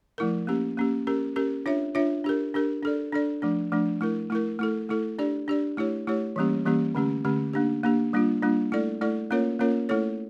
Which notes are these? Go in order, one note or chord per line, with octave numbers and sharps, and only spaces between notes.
F3 A3 E4 A#4
A#3 C#4 G4
A#3 C#4 G4
C#4 G4 A#4
C#4 G4 A#4
D4 F4 C#5 E5
D4 F4 C#5 E5
D4 G4 A#4
D4 G4 A#4
D4 A4 D5
D4 A4 D5
F3 A3 D4
F3 A3 D4
A3 E4 A#4
A3 E4 A#4
A3 E4 A4
A3 E4 A4
D4 G4 D5
D4 G4 D5
A3 E4 G4 C#5
A3 E4 G4 C#5
E3 G3 A#3 C#4 G4
E3 G3 A#3 C#4 G4
D3 A3 C#4 G4
D3 A3 C#4 G4
A#3 D4 G4
A#3 D4 G4
G3 A#3 D4 F4
G3 A#3 D4 F4
A3 E4 A4 D5
A3 E4 A4 D5
A#3 C#4 F4 A#4 C#5
A#3 C#4 F4 A#4 C#5
A3 E4 A4 C#5